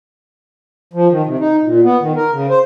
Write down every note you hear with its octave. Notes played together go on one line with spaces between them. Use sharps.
F3
D#3
C3
D#4
A#2
B3
D#3
A#4
C#3
C5